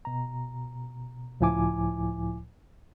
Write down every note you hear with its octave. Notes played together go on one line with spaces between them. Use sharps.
B2 A#5
C#2 A2 F3 E4 G#5 D6